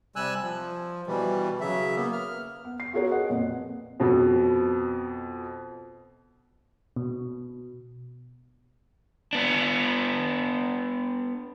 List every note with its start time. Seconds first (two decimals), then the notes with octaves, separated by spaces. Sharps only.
0.16 C3 G3 G#5 E6 F#6
0.43 F3
1.07 B2 E3 G3
1.61 C#3 F#3 E5
1.96 A#3 B3
2.12 F6
2.65 B3
2.80 C7
2.93 B3 F4 F#4 G#4 A#4 C#5
3.10 A4 B4 D#5 F#5
3.29 F2 A#2
4.00 F2 B2
6.96 B2
9.33 B3 D4